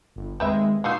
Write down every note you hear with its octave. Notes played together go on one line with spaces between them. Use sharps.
G1
D#2 G#3 C4 B4 E5
A#2 D#4 F4 F#4 E6 C7